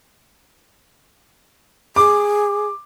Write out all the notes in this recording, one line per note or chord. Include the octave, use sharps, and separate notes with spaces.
G#4 D6